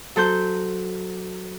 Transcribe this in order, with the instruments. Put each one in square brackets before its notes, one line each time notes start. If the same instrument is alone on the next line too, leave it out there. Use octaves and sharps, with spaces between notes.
[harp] F#3 A4 C5 G6